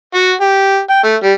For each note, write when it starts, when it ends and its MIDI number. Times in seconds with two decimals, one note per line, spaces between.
0.14 0.33 66
0.41 0.79 67
0.89 1.01 79
1.04 1.16 57
1.23 1.32 55